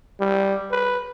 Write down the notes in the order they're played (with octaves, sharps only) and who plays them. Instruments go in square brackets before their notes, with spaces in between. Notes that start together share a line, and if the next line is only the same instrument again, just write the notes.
[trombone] G3
B4